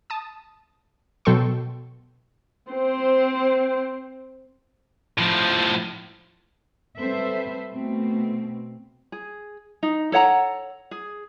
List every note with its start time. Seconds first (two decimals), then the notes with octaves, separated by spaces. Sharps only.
0.10 A5 D#6
1.25 B2 F#3 A4 G5 C6 C#6
2.72 C4 C5
5.18 A2 F3
6.99 G3 C4 A4 B4 C5 E5
7.71 B2 A3 C4
9.12 G#4
9.83 D#4
10.12 A4 C#5 F#5 A#5
10.91 G#4